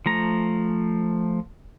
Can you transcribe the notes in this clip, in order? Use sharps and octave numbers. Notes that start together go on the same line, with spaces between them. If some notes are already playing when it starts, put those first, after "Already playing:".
F3 A3 A#5